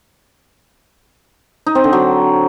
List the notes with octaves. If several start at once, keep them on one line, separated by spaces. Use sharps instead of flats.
D#4
C4
D3
F#3